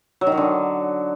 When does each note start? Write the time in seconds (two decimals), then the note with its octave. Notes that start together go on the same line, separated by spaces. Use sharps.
0.21 F#3
0.27 D#3
0.32 F#3
0.37 D3